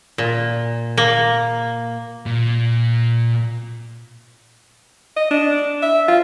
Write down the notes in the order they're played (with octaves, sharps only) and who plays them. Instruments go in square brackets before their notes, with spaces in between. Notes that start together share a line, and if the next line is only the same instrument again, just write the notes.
[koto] A#2
A#3
[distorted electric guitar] A#2
[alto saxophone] D#5
D4
E5
F4